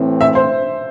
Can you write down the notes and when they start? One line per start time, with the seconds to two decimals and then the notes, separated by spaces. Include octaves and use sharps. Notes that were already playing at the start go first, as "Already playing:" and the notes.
Already playing: A2 E3 C4
0.21 E5
0.35 C5